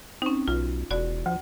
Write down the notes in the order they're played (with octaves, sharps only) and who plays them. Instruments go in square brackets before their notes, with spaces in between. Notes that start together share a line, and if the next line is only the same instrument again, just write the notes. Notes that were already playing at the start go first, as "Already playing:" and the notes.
[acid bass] C4 [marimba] C#4 D#4
[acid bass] B1 [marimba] F4
[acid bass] E1 [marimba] F#4 D5
[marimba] D2 [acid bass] F3